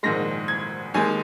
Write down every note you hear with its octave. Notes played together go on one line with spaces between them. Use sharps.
A#1 G#2 D#3 G#3 A#6
G#6
D#2 D#3 G#3 G#5